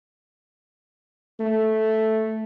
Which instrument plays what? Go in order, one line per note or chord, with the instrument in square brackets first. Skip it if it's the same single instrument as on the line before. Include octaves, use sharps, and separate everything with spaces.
[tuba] A3